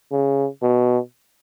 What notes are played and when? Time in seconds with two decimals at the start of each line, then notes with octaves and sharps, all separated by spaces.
0.12 C#3
0.63 B2